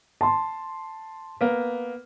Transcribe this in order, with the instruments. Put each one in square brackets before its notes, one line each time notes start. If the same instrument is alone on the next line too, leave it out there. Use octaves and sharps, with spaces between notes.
[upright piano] A5 C6
[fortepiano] A#3 B3